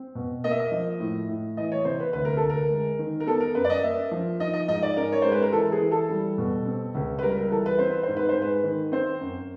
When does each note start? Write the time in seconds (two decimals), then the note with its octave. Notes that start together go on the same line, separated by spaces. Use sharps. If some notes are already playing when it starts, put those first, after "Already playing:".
Already playing: C4
0.15 B2
0.44 A#3 D#5
0.51 E5
0.59 D#5
0.72 F3
1.00 A2
1.29 A2
1.57 E3 D#5
1.72 C#5
1.85 C3 C5
2.00 B4
2.13 D2 B4
2.25 A#4
2.37 D2 A4
2.50 A#4
2.70 G#3
2.99 D#3
3.20 A#4
3.27 B3 A4
3.40 A#4
3.55 F#2 B4
3.65 D5
3.70 D#5
3.83 A#3 E5
4.11 F3
4.40 D#4 D#5
4.53 D#5
4.68 G#2 D#5
4.82 D5
4.96 C#4 A#4
5.12 C#5
5.22 G#3 C5
5.32 B4
5.42 A#4
5.52 E3 A4
5.72 G#4
5.81 E3
5.91 A4
6.10 G3
6.38 B2
6.66 C4
6.95 C#2
7.19 B4
7.23 G3 A#4
7.37 A#4
7.51 E3 A4
7.66 B4
7.78 C4 C5
7.91 B4
8.03 G#2 C5
8.17 B4
8.29 C5
8.36 G#3
8.42 B4
8.64 D#3
8.92 C4 C5
9.21 F#2